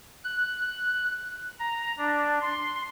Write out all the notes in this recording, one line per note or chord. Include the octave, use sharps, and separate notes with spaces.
F#6
A#5
D4
C6